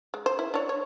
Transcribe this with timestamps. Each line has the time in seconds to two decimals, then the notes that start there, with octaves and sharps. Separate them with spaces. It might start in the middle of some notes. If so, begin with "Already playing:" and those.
0.14 G#3
0.26 C5
0.39 E4
0.54 D4 C#5
0.69 C#5